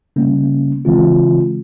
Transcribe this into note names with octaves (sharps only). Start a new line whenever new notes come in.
C#3 G3 A#3 C#4
C#3 E3 G#3 C4 F4